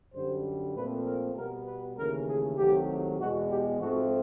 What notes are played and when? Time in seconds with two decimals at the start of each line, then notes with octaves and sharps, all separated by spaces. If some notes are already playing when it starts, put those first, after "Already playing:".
0.13 F#2 D3 G3 C5
0.75 A#2 F3 A3 C4 B4
1.04 A#4
1.35 B2 G3 B3 A#4
1.66 B4
1.97 D#2 C#3 E3 A3 A#4
2.28 G#4
2.57 C2 C3 D#3 F#3 A3 G4
3.19 E2 B2 G#3 F#4
3.49 G4
3.79 G#2 F3 A3 C4 F#4